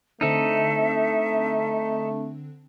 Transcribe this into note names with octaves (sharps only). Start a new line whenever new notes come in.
D3 A3 C4 D4 D#4 A4 E5